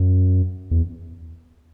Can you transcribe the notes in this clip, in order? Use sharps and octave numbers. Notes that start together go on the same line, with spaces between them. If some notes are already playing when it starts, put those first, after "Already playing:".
Already playing: F#2
E2